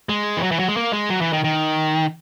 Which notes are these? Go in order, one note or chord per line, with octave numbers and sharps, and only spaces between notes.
G#3
E3
F#3
E3
F#3
G#3
A#3
G#3
F#3
E3
D#3
D#3